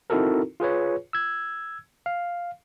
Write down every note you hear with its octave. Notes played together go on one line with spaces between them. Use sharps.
C4 D#4 E4 F#4 A4 A#4
F4 G#4 B4 C#5
E6 G#6
F5